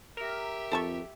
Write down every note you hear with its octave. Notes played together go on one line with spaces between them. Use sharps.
G4 A#4 E5
F2 A4 A5 C#6